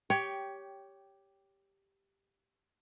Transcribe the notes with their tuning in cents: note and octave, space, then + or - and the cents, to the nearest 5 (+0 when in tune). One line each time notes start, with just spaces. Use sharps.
G4 +0 C#5 +15 G5 -5